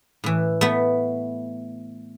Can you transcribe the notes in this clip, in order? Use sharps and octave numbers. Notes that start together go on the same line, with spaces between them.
A2 E3
A3 B3